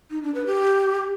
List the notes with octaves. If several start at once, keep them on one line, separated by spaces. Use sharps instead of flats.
D#4
D4
B4
G4